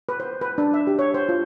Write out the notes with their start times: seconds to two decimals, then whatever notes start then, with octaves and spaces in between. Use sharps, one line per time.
0.09 B4
0.20 C5
0.41 B4
0.58 D4
0.74 E5
0.87 G4
0.99 C#5
1.14 C5
1.29 F4